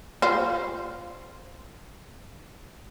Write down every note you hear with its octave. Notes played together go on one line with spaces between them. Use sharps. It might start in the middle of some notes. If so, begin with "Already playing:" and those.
F4 C5